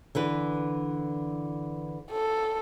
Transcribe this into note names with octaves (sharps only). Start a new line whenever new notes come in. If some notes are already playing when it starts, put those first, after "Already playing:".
D3 E3 B4
A4